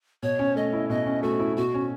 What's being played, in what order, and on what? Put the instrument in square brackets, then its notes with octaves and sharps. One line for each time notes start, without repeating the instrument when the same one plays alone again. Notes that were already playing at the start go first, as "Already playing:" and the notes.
[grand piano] B2 [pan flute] C#5
[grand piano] C#4
[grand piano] A3 [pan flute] D#5
[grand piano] E4
[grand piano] B2 [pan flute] D#5
[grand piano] C#4
[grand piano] A3 [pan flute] F#4
[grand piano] E4
[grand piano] B2 [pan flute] F#4
[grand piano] C#4